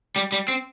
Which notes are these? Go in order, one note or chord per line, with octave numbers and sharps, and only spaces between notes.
G3
G3
C4